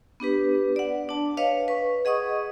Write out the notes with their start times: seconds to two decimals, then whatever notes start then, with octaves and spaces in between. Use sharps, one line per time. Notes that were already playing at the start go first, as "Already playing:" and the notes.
0.20 B3 D4 G4 B4
0.76 D5 F#5
1.09 D4 A5
1.37 B4 C#5 D#5 F5
1.68 B4 C#6
2.05 G#4 D#5 F#5 C#6 D#6